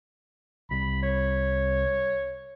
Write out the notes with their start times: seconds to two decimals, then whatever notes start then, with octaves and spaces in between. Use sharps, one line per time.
0.71 C2 B5
1.03 C#5